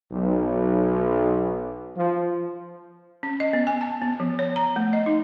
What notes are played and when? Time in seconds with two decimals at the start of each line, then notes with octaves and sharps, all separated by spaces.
0.12 B1
1.96 F3
3.23 C#4
3.40 D#5
3.53 B3
3.67 G#5
3.81 A5
4.02 B3
4.20 F3
4.39 C#5
4.56 A#5
4.76 A3
4.93 D#5
5.06 D#4